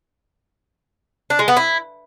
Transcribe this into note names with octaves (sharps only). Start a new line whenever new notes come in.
D4
G#3
B3
E4